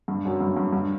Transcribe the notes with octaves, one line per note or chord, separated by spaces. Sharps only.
G2
F#2
G2
G2
G2